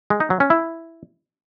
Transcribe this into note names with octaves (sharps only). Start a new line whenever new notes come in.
G#3
D#4
F#3
C#4
E4